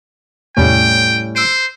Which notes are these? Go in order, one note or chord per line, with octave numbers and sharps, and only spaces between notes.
E2 A2 C3 G3 A3 C#4 G5
C5 E6 D7